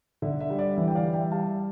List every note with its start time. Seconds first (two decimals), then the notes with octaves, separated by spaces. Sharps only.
0.22 D3 E5
0.40 E5
0.50 G3
0.59 D5
0.77 E3 E5
0.88 G5
0.95 D5 F5
1.05 G3
1.14 E5 G5
1.32 G3 F5 A5